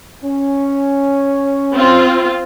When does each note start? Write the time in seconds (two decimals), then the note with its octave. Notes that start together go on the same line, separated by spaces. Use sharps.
0.24 C#4
1.74 C4 F4